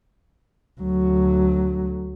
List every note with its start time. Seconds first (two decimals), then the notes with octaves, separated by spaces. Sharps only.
0.80 D2 F#3